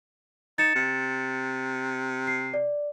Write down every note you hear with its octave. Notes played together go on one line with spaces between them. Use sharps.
D#4 A6 C#7 E7
C3
C7
D5